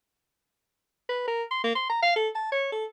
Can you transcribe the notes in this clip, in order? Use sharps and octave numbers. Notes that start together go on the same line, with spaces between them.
B4
A#4
C6
A#3
C6
A#5
F5
A4
A5
C#5
A4